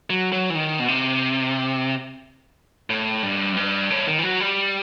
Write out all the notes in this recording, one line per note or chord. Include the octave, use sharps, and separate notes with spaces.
F#3
F#3
E3
D#3
B2
C3
A2
G2
F#2
G2
A2
D#3
E3
F#3
G3